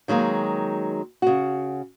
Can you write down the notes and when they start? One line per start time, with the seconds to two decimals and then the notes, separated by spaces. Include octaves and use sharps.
0.08 D#3 F#3 G#3 A#3
1.22 C#3 F#4